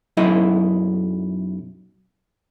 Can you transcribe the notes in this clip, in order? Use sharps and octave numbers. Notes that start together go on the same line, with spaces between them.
B1 F#2 E4 D#5